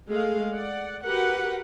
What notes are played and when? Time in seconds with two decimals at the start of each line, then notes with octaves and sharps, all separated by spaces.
0.10 G#3 A3 G#4 F5
0.52 D5 F#5
1.03 F#4 G4 A#4 B4 F#5